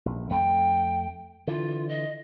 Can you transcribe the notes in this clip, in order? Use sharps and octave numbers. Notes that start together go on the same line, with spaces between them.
A#1
F2 A3 G5
D3 E3 F4
D#5